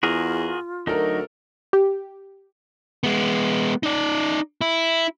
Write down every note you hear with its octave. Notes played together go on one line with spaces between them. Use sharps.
E2 F4 F#4 G#4 A#4
D2 F#3 D#4 A4 A#4
G4
G#3 B3
D#4 D5
E4